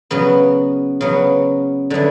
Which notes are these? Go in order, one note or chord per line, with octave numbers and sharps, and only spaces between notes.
C#3 F#3 B3
C#3 F#3 B3
D3 F#3 B3 E4